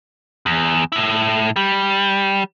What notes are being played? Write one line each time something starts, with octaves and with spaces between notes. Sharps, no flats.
E2
A2 E4
G3